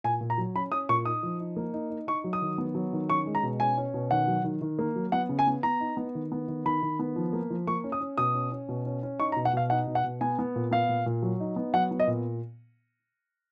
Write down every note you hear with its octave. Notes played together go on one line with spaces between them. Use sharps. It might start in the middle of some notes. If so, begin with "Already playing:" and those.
A#2 G#5
A#2
A#5
F#3
C#4 B5
C#4 D#6
A#2 C#6
D#4 D#6
F3
D#4
A#3
D#4
D#4
D#4 C#6
F#3
D#6
D#3
B3
F#3
D#3
C#4 C#6
G#3
A#5
B2
C#4 G#5
C#4
B2
D#3 F#5
F#3
D#3
D#3
A#3
F#3
B3 F#5
C#3
G#5
B3
B3 A#5
D#4
B3
D#3
B3
D#3
D#3 B5
D#3
B3
F3
A#3
F3
A#3 C#6
C#4
D#6
C#4
B2 D#6
C#4
C#4
B2
C#4
C#4
D#4 C#6
A#5
B2
F#5
B2 F5
D#4 F#5
B2
F#5
B2
B3 G#5
B3
A#2
B3 F5
A#2
A#2
F#3
D#4
B3
F#3 F#5
B3
D#5
A#2